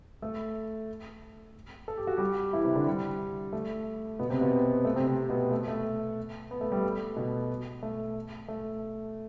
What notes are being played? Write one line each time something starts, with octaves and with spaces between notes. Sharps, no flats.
A3 A4
A4
G4
F#4
G3 G4
E3 E4
C3 C4
D3 D4
G3
A3
B2 B3
C3 C4
B2 B3
A3
C3 C4
C3 C4
B2 B3
A3
A3
B3
A3
G3
A3
B2 B3
A3
A3